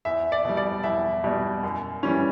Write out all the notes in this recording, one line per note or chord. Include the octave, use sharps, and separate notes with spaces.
E2 E5
D5
B2 G3
D5
E2 E5
B2 G3
F#2
E3 G3 C#4